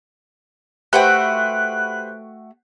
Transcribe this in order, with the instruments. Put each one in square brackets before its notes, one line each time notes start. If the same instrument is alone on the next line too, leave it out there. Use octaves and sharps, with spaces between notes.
[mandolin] A3 F#4 G5 [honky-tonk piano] G4 B4 C5 [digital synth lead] F#6